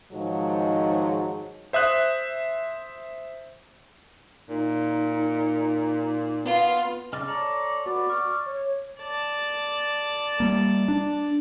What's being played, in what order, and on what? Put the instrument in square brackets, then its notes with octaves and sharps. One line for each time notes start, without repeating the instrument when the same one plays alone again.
[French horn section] G#2 D#3 F3 F#3 G#3
[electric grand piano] C5 E5 D#6 F#6
[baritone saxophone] A#2 [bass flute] D#4
[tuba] B3 [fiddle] F4
[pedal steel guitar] C#3 D#5 F6 [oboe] A5 [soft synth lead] D6
[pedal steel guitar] A4 C#5 D5 [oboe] A#5
[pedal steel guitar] B3 [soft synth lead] F#4 [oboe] D5
[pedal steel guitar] C#6 [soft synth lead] F6
[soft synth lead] C#5
[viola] D5 A5
[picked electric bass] G3 A#3
D4